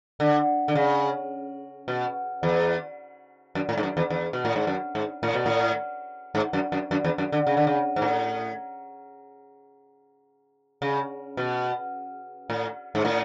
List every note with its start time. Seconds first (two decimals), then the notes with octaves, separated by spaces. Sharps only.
0.20 D3
0.68 D3
0.75 C#3
1.88 B2
2.43 E2
3.55 F#2
3.69 A2
3.77 G#2
3.83 F#2
3.97 E2
4.10 E2
4.33 B2
4.45 A2
4.56 G#2
4.67 F#2
4.95 G#2
5.23 A2
5.34 B2
5.46 A2
6.35 G#2
6.53 F#2
6.72 F#2
6.91 F#2
7.04 E2
7.18 F#2
7.32 D3
7.47 C#3
7.57 D3
7.67 C#3
7.96 G#2
8.02 A2
10.82 C#3
11.37 B2
12.50 A2
12.95 G#2
13.05 A2